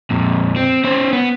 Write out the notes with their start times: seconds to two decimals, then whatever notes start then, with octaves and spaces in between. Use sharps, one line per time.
0.10 F2 A#2
0.56 C4
0.84 C#4 C5
1.13 B3